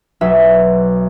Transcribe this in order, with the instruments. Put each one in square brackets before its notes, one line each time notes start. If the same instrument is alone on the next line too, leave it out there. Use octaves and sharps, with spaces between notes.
[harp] B1 F#3 E5